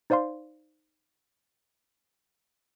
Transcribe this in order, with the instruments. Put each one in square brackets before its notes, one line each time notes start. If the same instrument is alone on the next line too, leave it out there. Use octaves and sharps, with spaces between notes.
[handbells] D#4 C5 D5 F5 C6